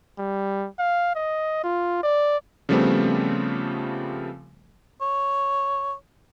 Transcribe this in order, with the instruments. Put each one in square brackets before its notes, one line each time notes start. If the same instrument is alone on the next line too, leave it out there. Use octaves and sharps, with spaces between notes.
[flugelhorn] G3
F5
D#5
F4
D5
[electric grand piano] C#3 F3 G3 A3 B3 C4
[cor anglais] C#5